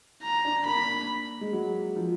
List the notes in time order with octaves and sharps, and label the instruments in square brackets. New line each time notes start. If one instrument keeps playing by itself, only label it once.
[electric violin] A#5
[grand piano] D4
[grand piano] A#3 [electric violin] B5
[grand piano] G#3
F#3
F3